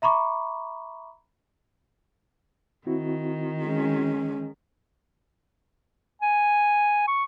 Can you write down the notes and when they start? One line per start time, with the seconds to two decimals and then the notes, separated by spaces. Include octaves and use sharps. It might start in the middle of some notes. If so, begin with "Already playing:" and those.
0.02 E5 A#5 B5 C#6 D6
2.87 D#3 C4 E4 F#4
3.63 G#3 C#4
6.22 G#5
7.08 C#6